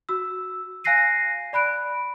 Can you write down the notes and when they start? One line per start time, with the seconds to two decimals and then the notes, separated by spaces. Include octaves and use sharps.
0.09 F#4 E6
0.84 F5 G#5 F#6 A#6 C7 D#7
1.53 D5 B5 F#6 D7